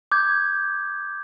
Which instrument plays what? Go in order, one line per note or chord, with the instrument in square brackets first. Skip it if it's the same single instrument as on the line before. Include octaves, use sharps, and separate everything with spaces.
[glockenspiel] D6 G6 G#6